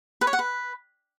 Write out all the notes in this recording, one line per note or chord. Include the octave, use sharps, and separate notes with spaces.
B4
C#5
F#5
B4